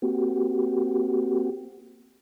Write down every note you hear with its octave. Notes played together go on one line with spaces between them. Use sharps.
A#3 C4 F#4 G4